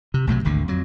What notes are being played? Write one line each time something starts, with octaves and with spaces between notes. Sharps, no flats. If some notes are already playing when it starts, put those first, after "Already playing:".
C3
B1 A2 C3 F#3
G#1 D2 D3
F2 F#3